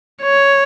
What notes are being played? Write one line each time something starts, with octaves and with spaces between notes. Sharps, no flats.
C#5